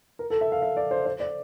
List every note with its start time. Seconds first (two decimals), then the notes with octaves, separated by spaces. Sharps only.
0.19 A#4
0.30 A4
0.41 E5
0.52 F5
0.62 E5
0.77 D5
0.91 C5
1.06 C5
1.20 D5